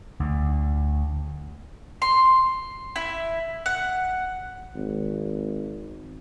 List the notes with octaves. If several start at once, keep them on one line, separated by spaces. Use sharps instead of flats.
D2
C6
E4
F#5
G#1